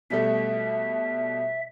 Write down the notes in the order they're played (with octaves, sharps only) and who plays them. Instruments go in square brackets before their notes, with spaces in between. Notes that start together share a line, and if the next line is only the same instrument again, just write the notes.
[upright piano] B2 G3 A3 [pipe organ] E5